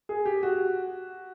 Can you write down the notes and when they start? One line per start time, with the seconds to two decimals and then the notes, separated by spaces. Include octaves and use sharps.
0.09 G#4
0.26 G4
0.43 F#4